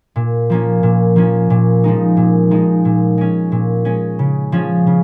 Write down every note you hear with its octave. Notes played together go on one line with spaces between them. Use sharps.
A#2
F3 A#3 C#4
A#2
F3 A#3 C#4
A#2
F3 G#3 D#4
A#2
F3 G#3 D#4
A#2
G#3 C#4
A#2
G#3 C#4
C#3
F3 C#4 G#4
C#3